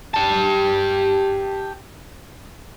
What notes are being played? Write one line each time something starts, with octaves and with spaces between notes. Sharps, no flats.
G4 A5